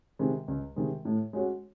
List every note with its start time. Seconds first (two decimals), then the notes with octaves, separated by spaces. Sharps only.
0.19 C3 D#3 G#3
0.48 C#2
0.76 C3 D#3 G#3
1.05 A2
1.33 G#3 C#4 F#4